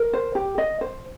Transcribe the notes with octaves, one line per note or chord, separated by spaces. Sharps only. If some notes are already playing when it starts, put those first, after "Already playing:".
Already playing: A#4
C5
G4
D#5
C5